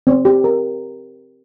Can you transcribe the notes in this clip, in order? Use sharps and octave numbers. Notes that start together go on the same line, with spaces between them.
C4
G4
A#4